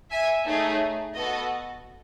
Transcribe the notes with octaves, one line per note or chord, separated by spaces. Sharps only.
E5 G#5
A3 D#4 G#4 C#5 E5
B3 F#4 A4 D#5